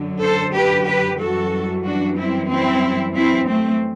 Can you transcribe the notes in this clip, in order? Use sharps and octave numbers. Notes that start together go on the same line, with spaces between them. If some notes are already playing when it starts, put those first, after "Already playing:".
Already playing: F#2 D3 F#3
A4 C5
G4 B4
G4 B4
F#2 E3 G3 F#4 A4
D4 F#4
C4 E4
C4 E4
C4 E4
A3 C4